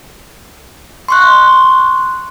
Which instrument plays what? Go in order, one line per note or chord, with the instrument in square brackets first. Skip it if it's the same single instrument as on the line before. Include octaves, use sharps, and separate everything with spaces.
[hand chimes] C6 C#6 F#6